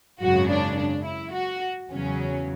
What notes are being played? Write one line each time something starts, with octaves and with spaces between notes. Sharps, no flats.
G#1 F#2 C#3 F#4
D4
D4
E4
F#4
E2 C#3 F#3 C#4